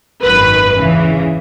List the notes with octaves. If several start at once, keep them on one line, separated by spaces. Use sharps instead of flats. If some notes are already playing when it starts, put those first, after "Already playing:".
G#1 F#2 D#3 B4
E2 C#3 E3